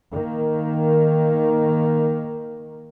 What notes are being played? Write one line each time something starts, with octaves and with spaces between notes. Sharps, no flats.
D#3 A#3